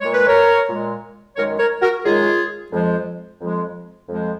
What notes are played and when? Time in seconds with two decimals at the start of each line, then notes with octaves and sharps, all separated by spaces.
0.01 A#2 G#3 C#5
0.14 B4
0.27 A#4 C#5
0.68 A#2 G#3
1.36 F#2 D#3 G#3 A#4 C#5
1.59 A#4 C#5
1.81 F#4 A#4
2.04 F#2 D#3 G#3 F4 G#4
2.72 F2 F3 G#3
3.40 F2 F3 G#3
4.08 F2 F3 G#3